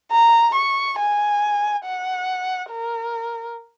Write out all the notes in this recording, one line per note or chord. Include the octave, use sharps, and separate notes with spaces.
A#5
C#6
G#5
F#5
A#4